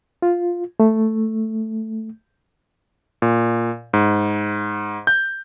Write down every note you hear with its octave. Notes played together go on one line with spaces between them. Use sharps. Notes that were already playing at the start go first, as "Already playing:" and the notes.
F4
A3
A#2
G#2
G6